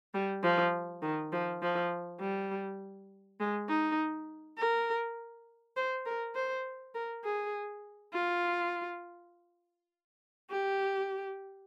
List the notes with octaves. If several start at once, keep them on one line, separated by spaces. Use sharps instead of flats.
G3
F3
D#3
F3
F3
G3
G#3
D#4
A#4
C5
A#4
C5
A#4
G#4
F4
G4